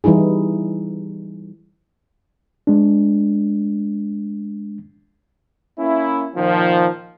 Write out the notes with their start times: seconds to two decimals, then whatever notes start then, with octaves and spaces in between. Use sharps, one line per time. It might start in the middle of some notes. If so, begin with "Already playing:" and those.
0.04 E3 G3 D#4 E4 G#4
2.67 G#3 D4
5.78 A#3 C#4 E4
6.36 A#2 D#3 F3